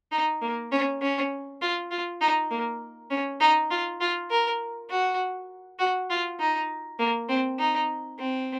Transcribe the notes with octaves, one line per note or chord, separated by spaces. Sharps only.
D#4
A#3
C#4
C#4
F4
F4
D#4
A#3
C#4
D#4
F4
F4
A#4
F#4
F#4
F4
D#4
A#3
C4
D#4
C4